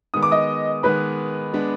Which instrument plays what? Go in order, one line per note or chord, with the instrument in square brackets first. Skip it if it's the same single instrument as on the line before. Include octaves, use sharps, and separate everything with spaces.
[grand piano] D#3 G#3 B3 [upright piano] D#6
[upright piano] D6
D#5 D#6
[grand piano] D#3 G#3 B3 [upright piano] B4 B5
[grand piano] G#3 B3 D4